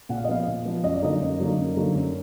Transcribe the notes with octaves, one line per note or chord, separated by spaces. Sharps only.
A#2 F#5
F5
D#5
F3 B3 F5
A#2
F3 B3
F#2 D#5
D5
D3 F#3 A#3 D#4 D#5
F#2
D3 F#3 A#3 D#4
F#2
D3 F#3 A#3 D#4
F#2